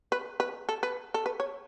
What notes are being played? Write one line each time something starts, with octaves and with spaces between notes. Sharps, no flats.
B4
B4
A4
B4
A4
B4
C#5